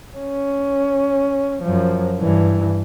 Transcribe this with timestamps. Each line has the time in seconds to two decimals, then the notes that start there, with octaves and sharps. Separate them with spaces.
0.17 C#4
1.62 F#2 F3
2.20 G2 E3